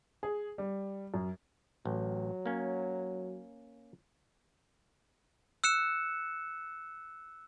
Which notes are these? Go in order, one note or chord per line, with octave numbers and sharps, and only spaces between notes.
G#4
G3
F#2
A1 F#3
A#3 C#4
E6 F#6 C#7 E7